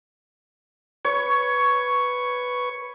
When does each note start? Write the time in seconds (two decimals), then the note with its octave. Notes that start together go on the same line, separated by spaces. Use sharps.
1.05 B4 C#5 C#6